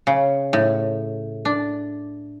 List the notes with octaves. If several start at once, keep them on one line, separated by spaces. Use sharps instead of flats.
C#3
A2
D4